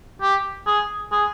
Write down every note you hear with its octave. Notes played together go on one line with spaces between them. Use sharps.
G4
G#4
G#4